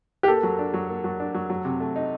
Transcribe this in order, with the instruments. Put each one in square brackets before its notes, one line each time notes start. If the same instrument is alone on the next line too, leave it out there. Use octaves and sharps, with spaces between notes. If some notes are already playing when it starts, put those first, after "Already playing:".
[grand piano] G4
[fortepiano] A#3 [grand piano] A4
[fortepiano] F#3
D4
F#3
A#3
F#3
D4
F#3
F#3
C3
A3
D#4